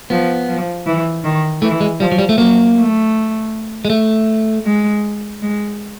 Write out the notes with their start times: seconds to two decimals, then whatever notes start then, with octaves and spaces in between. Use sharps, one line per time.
0.10 F3 B3
0.49 F3
0.86 E3
1.24 D#3
1.62 E3 A3
1.81 G#3
2.00 F3 G3
2.12 F#3
2.19 G3
2.29 A3
2.38 F#3 A#3
2.76 A3
3.85 G#3
3.90 A3
4.66 G#3
5.42 G#3